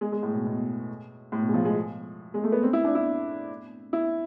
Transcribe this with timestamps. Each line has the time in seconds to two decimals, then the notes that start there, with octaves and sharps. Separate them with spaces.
0.01 G#3
0.12 G#3
0.23 A2
0.34 B2
0.46 B2
1.32 A2
1.42 B2
1.49 G#3
1.54 F3
1.65 G#3
2.34 G#3
2.44 A3
2.52 B3
2.63 C4
2.73 E4
2.84 D4
2.95 E4
3.93 E4